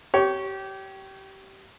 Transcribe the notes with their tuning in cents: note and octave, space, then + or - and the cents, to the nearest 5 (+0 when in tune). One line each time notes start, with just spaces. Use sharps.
G4 -25 C#5 +5